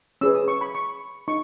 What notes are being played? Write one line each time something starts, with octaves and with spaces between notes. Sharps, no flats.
C#4 G#4 B4 E6
D#6
C#6
B5
C#6
D#4 C#6